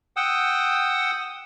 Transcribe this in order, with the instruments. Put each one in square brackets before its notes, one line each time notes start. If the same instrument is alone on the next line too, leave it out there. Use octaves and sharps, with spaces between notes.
[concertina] F#5 G5 D#6 E6